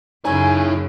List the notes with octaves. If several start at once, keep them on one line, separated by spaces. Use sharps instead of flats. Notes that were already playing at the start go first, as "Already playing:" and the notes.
F#2 C#3 D#4 E4 C#5 G#5